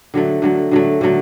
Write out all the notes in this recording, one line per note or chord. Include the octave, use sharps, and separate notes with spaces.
D3 F#3 A3
D3 F#3 A3
D3 F#3 A3
D3 F#3 A3